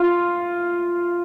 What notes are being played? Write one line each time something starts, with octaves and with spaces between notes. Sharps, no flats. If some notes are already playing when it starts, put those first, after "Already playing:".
Already playing: F4